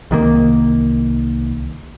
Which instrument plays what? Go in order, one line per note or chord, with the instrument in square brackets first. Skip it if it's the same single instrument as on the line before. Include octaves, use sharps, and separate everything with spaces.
[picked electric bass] C2 D#3 F3 A#3